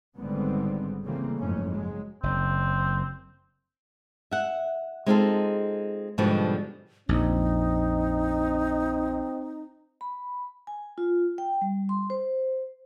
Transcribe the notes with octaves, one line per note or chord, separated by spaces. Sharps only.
G#1 G#2 D3 G3 B3 C4
C#3 E3 G3 A3 A#3 C4
F#1 F2 G#2 A3 C#4
F#3 G#3
F#1 C4
E5 F#5
G#3 C4 D#4 F4 G#4 A4
G#2 B2 D3 F3 G3
A#1 F2 C4 D#4
B5
G#5
F4
G5
G3
C6
C5